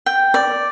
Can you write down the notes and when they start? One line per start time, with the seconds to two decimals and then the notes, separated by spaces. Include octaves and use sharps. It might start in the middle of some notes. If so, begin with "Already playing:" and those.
0.06 G5
0.34 D5